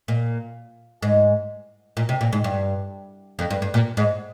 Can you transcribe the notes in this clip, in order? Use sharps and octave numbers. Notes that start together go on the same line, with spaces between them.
A#2
G#2
A#2
C3
A#2
G#2
G2
F2
G2
G2
A#2
G#2